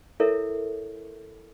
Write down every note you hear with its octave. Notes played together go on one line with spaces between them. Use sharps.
E4 A4 A#4 C#5 E5